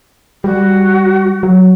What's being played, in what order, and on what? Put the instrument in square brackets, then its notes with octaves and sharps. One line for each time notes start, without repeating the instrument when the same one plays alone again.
[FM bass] G3 [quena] F#4
[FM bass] F#3